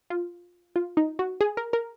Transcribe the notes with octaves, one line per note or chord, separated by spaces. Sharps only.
F4
F4
D#4
F#4
G#4
A#4
A#4